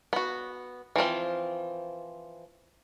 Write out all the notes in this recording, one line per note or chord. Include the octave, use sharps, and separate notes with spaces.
B3 F#4
E3 F3 C4 F4